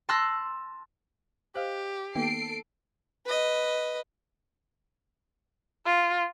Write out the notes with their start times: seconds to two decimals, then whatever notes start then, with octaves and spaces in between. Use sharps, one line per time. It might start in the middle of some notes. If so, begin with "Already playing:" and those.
0.09 A5 C6 E6 F#6 A#6
1.55 G4 C5 D#5 F5 F#6
2.15 D#3 A#3 B3 D#4 A4 G5 C7 D7
3.26 B4 D#5
5.86 F4